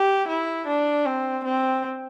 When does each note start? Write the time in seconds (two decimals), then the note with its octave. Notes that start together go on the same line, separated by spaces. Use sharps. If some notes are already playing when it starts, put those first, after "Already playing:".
Already playing: G4
0.28 E4
0.67 D4
1.06 C4
1.45 C4